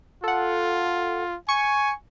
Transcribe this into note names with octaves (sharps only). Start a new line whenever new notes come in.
F4 A4 F#5
G#5 C#6 C#7